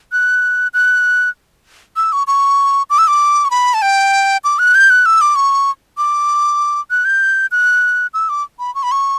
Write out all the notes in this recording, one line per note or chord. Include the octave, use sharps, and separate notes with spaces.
F#6
F#6
E6
C#6
C#6
D6
E6
D6
C#6
B5
A5
G5
D6
F#6
G6
F#6
E6
D6
C#6
D6
F#6
G6
F#6
E6
D6
B5
C#6
B5
C#6